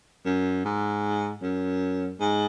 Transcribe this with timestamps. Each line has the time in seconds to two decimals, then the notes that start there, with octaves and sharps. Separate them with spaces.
0.25 F#2
0.65 G#2
1.42 F#2
2.20 G#2